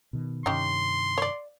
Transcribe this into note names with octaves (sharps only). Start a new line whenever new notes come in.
B2 D#3
G2 C3 D#3 C#4 D#4 G4 C6
C#5 D5